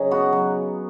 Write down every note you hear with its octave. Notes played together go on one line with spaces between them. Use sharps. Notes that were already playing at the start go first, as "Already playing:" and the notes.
Already playing: C#3 F#3 D#4
B3 F#4
F#3